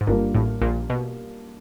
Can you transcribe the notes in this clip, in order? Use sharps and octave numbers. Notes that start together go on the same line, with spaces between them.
G#2
G1 G2 G3 A#3 D4 F4 A#4
A1 A2
A#1 A#2
B2